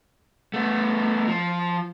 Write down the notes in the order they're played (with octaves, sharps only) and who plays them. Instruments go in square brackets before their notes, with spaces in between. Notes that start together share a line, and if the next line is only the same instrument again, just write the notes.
[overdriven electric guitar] A3 B3
F3